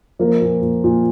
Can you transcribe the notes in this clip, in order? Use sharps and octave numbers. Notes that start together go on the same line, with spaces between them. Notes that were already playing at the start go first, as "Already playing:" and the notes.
F3 A#3 A#4
A#2
A#2
A#2